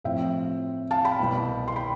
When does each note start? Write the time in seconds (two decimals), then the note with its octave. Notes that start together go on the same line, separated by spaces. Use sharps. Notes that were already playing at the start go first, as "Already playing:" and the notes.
0.04 A2 F3 C4 E5 G5
0.91 F5 A5
1.04 G5 B5
1.20 C2 B2 B3
1.68 C6
1.76 G5 B5